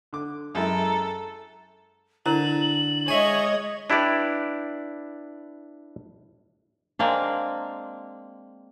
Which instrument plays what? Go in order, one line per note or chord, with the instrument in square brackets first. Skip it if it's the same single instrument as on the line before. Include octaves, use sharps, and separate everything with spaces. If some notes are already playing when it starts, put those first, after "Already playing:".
[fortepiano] D3 D6
[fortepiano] F#2 G#3 E4 [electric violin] A4 [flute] A#5
[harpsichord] D3 [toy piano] E4 A#4 C5 [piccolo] F#7
[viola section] G#3 C#5 D#5 [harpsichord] E5 G#5
[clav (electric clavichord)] D4 E4 G4 B4 D5
[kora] G#3 A#3 C4 D4